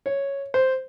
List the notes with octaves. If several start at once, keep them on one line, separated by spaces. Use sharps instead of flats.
C#5
C5